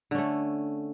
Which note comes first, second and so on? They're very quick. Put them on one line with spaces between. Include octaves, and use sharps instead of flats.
D3 C#4 A3